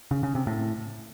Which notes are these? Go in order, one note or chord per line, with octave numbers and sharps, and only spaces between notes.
C#3
C#3
C3
A2